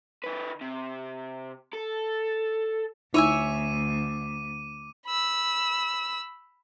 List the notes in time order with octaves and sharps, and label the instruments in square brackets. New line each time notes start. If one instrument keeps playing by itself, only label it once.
[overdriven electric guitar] D#3 B4
C3
A4
[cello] D2 [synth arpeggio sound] D#4 E4 [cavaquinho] C#5 E5 G#5 [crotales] D6 D#7
[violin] B5 E6